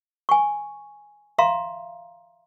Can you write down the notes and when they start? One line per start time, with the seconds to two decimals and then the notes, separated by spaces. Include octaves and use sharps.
0.29 G#5 C#6
1.38 E5 F5 A#5 C6